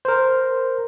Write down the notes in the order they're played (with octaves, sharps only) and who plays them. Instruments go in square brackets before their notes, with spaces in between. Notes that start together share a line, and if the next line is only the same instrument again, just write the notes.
[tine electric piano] A#4 C5